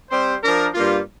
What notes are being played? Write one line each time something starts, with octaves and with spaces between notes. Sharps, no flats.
G3 C4 G4 C5
F3 D4 A#4
G2 G3 A#3 F4